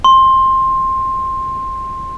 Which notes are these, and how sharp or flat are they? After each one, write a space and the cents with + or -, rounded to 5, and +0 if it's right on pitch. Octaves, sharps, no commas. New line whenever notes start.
C6 +15